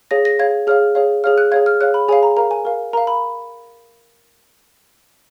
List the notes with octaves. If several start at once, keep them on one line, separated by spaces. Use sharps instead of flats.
G#4 C#5 F5 A#6
A#6
G#4 C#5 F5 G#6
G#4 C#5 F5 F6
G#4 C#5 F5
G#4 C#5 F5 F6
F#6
G#4 C#5 F5 G#6
F6
G#4 C#5 F5 F#6
B5
G#4 C#5 F5 G#5
A#5
A#4 F5 A#5
G#5
A#4 F5
A#4 F5 A#5
B5